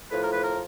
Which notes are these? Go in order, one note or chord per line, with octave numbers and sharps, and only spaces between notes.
A2 F3 B4
A#4
B4
A#4